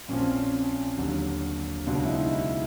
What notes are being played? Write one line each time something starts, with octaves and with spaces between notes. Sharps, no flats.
A#1 A#2 F3 C#4
C4
C#4
D#2 D3 F#3
C#2 B2 F#3 D4
E4
D#4
E4